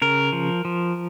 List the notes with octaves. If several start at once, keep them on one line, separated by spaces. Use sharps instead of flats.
C#3 A#4
F3
F3